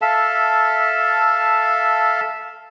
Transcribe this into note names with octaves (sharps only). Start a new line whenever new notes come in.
A4 E5 F5 A5